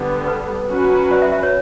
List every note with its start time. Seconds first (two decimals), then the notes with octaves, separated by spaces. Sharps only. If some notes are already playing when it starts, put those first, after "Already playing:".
Already playing: D3 G3 B3
0.28 B4
0.69 F#3 C#4 F#4 B4
1.11 D5
1.22 E5
1.32 E5
1.43 C#5